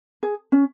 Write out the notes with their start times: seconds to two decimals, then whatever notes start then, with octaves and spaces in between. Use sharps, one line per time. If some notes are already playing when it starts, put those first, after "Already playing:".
0.23 G#4
0.52 C#4